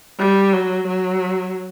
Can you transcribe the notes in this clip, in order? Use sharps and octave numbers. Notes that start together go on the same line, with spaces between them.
G3
F#3
F#3